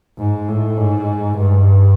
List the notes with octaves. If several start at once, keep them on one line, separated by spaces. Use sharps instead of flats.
G#2
A2
G#2
G2